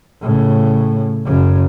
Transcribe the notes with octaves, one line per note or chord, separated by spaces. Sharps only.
A2 C#3
F#2 C#3